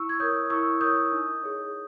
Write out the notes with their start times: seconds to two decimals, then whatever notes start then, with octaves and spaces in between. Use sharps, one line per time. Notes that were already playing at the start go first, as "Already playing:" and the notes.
Already playing: E4 C#6 E6
0.09 G#6
0.20 A#4 C#5 D#6 G6
0.50 E4 C#6 E6
0.81 A#4 C#5 D#6 G6
1.12 D#4
1.43 G#4 C#5